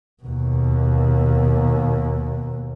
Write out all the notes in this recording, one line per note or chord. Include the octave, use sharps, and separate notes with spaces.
D#2 B2